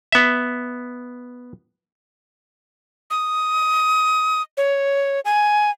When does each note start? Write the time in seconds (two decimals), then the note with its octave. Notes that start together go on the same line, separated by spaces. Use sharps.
0.12 B3 E5
3.11 D#6
4.57 C#5
5.25 G#5